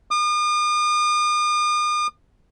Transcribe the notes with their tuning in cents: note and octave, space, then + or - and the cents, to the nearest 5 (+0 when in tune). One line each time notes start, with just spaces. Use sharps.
D#6 -45